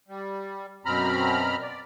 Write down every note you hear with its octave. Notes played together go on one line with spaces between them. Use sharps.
G3
F#2 B2 C4 A#5 B5 F6
D5